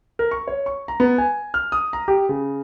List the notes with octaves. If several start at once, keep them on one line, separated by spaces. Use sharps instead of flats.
A#4
C#6
C#5
C#6
A#5
B3
G#5
F6
D#6
A#5
G4
C#3